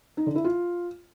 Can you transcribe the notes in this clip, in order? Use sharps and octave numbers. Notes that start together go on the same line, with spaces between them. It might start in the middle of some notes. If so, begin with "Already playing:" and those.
D#4
D3
E4
F4